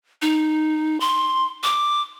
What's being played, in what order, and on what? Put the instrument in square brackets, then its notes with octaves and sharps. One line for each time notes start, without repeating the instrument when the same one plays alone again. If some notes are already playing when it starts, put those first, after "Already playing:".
[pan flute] D#4
C6
D6